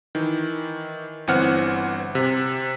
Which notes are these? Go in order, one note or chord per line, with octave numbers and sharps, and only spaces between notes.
D#3 E3
G1 E3 C4 F#5 F6
C3